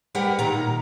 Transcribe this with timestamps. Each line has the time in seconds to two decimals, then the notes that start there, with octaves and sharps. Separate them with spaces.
0.15 G3 G4 A#4 B4 F#5
0.39 A#2 D#3 A#4 F#5 A#5